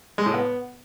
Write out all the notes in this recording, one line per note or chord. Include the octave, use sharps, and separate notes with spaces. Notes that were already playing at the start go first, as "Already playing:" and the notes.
G#3
A2
B3